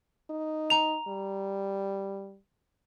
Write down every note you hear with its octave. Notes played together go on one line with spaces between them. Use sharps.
D#4
A#5 F7
G3